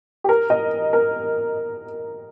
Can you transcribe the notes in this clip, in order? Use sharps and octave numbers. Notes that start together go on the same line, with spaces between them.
G4
A#4
D#5
A#4